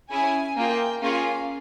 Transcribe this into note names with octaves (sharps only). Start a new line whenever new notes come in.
C#4 E4 G#4 G#5
A#3 F4 G#4 G5
A#3 C#4 F4 G#4 F5